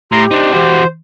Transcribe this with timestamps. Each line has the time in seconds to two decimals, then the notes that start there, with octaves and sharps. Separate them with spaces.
0.12 A2 G4 A#5 C6
0.31 D4 D#4 C5
0.53 E3 F#4 C5